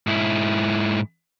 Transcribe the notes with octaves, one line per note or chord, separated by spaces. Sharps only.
G#2 E4